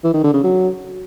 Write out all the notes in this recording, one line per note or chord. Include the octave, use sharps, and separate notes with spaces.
E3
D#3
D3
C#3
F#3